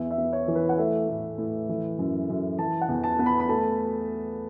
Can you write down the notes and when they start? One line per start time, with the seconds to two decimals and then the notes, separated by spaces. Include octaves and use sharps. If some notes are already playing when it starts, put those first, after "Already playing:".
Already playing: E2 E5
0.11 E5
0.18 B3
0.33 C#5
0.48 E3
0.55 B4
0.69 F#5
0.78 A3 E5
1.09 A2
1.38 A2
1.69 E3
1.99 F#2
2.29 F#2
2.58 E3 A5
2.81 F#5
2.89 E2
3.04 A5
3.19 B3
3.26 B5
3.40 B5
3.49 A3 A5